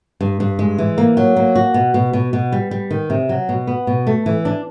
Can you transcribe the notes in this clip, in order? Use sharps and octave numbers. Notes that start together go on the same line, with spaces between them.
G2
G2
G#3
E3
A#3
F#3
A#3
F#4
B2
B2
B2
B2
G3
G3
D#3
C3
F#3
B2
B3
B2
A3
E3
D4